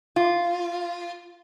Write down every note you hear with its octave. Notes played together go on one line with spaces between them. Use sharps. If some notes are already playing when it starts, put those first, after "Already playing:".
F4